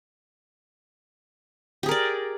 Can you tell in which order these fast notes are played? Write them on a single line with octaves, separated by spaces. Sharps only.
G4 G#4 A#4 D5